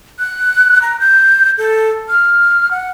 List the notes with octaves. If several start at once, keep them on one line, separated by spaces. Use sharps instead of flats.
F#6
A#5
G6
A4
F6
F#5